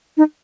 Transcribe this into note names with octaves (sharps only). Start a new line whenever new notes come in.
D#4